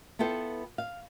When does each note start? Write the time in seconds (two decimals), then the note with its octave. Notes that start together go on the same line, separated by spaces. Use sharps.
0.19 B3 E4 F4 A4 G5
0.78 F5